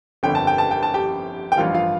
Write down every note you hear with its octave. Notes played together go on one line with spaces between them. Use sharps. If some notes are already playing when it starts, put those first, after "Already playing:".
G1 F2 D3 G5
A5
G5
A5
G5
A5
G4 G5
G5
A1 G2 F3 F4 F5
F4 F5